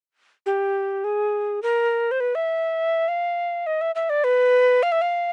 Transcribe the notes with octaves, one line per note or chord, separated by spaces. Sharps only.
G4
G#4
A#4
C5
B4
E5
F5
D#5
E5
E5
D5
B4
F5
E5
F5